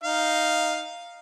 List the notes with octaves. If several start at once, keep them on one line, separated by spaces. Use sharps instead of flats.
D#4 F5